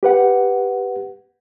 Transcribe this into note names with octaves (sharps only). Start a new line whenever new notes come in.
G4 B4 F#5